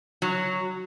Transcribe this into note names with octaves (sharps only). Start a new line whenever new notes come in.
F#3